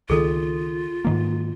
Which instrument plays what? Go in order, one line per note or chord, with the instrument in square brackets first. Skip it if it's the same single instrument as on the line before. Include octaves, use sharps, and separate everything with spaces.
[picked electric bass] C#2 D#3 [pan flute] F4 [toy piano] G#4 A4
[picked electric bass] G#2 D#3 A#3